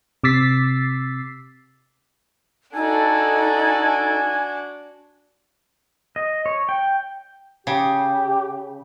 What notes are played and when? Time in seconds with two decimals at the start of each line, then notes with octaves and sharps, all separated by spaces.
0.24 C3 D6 E6 A6 B6 C7
2.75 D4 D#4 F#4 A4 G#5
6.16 D#5
6.46 C#5
6.69 G5
7.67 C#3 G4